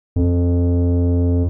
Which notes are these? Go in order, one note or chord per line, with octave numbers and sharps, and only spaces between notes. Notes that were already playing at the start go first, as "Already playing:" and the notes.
F2